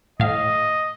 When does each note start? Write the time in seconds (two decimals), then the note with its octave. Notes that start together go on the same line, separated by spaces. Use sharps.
0.20 A2 D#5 F5